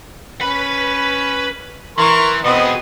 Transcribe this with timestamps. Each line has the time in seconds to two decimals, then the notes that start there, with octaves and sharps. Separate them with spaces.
0.41 C#4 B4 B5
1.98 E3 A#4 C6 C#6
2.45 B2 B3 C4 G#4 D#5